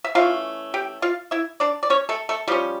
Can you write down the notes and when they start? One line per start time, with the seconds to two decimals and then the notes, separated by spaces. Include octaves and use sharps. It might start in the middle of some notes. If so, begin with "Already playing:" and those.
0.04 E5
0.15 E3 A3 C#4 F4 F5
0.74 G4 G5
1.02 F4 F5
1.31 E4 E5
1.60 D4 D5
1.83 D5
1.90 C#4 C#5
2.09 A3 A4
2.29 A3 A4
2.48 F3 G3 C#4 G4